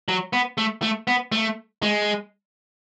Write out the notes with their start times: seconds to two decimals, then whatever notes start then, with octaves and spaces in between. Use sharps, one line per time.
0.08 F#3
0.33 B3
0.58 A3
0.82 A3
1.07 B3
1.32 A3
1.82 G#3